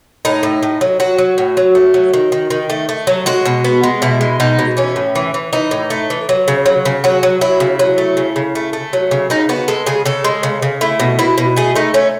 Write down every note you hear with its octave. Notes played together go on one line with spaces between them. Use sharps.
A2 D#4
A2
A2
F#3
F#3 F#4
F#3
A2
F#3
A3
F#3
D#3
D#3
D#3
A3
A3
F#3
G#3 F#4
B2
B3
G#3
B2 E4
G#3
B2 D#4
B2
E3 C#4
A2
E3
E3
E3 D#4
A2
A3
E3
F#3
C#3
F#3
C#3
F#3 F#4
F#3
F#3 E4
C#3
F#3
A3
C#3
C#3
A3
A3
F#3
C#3
C#3 D#4
B3 F#4
G#3 A4
C#3 G#4
C#3 A4
G#3
C#3
C#3
A3 E4
B2
B2 E4
B2
A3 G#4
A3 D#4
A3 C#4